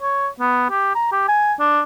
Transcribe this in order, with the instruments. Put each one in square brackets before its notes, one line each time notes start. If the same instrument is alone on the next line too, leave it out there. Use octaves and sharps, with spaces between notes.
[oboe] C#5
B3
G4
A#5
G4
G#5
D4